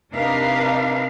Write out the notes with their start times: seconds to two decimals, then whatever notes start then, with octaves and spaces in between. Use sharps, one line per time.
0.12 C3 D4 D#4 A#4 B4 F5